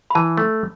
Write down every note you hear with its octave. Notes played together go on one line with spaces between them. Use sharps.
B5
E3 A5
A3